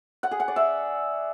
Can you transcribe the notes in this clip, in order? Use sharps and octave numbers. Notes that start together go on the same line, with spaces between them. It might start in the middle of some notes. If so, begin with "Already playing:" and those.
F#5
G#4
F#5
D5
E5